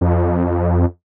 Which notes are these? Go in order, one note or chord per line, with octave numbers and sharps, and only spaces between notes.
F2